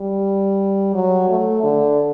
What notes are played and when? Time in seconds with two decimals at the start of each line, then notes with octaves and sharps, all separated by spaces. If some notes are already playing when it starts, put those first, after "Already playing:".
Already playing: G3
0.94 F#3
1.29 A3
1.63 D3